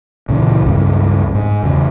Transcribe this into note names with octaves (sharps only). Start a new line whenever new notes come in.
C#2 A#2 C#3 E3
C#2 G2
G#2
E2 C#3